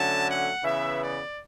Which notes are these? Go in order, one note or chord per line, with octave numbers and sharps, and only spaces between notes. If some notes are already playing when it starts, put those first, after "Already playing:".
Already playing: D3 F#3 A3 C#4 A5
F#5
C#3 E3 B3 E5
D5